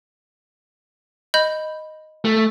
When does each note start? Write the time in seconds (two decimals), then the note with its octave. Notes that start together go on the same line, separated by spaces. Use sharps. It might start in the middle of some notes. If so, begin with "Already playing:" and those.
1.34 D#5 B5 G6
2.25 A3